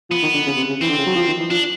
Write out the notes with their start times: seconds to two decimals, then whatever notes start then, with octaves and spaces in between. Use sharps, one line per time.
0.10 F3 B3
0.23 D#3
0.34 D3
0.46 C#3
0.57 C3
0.69 C#3
0.81 E3 C4
0.90 D3
0.98 C#3
1.06 F#3
1.16 F3
1.28 D#3
1.39 E3
1.50 F3 D4